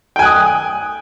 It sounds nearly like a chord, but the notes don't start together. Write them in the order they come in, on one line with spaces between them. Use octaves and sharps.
G5 G#5 F#6 D#6